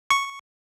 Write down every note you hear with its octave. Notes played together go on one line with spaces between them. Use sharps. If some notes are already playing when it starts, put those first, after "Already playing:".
C#6